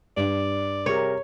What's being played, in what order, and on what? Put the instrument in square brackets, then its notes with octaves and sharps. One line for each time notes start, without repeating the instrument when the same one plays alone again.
[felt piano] G2 [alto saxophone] D5
[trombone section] C3 G3 A#4 [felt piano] G4 G#4 [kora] C#5